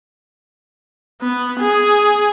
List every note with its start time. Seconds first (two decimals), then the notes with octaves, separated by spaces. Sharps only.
1.21 B3
1.60 G#4